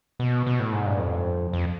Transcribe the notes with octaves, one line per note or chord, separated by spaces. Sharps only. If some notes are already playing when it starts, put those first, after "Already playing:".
B2
B2
A2
G#2
G2
F2
F2